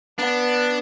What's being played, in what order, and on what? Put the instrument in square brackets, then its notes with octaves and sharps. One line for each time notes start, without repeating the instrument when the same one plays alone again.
[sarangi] B3 [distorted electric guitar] D4